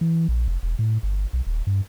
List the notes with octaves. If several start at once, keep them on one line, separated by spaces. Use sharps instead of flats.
E3
A#1
F1
E1
A2
G1
B1
D#1
G2